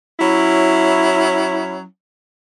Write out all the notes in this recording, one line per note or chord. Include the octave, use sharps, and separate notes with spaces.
F#3 C#4 E4